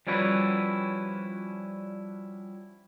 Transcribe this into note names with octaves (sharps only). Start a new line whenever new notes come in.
F3 G3 C#4 E4 F#4 B4